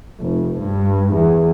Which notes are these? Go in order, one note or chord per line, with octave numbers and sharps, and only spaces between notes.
F1
G2
E2